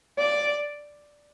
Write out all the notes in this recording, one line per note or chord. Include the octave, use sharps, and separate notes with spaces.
D5